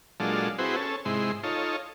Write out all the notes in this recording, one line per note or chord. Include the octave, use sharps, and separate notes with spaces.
A#2 F#3 G#3 D4 F4 A4
C4 E4 F#4 G#4 B4 C5
C#4 A4
G#2 C3 G#3 E4 C6
D#4 F4 A4 C#5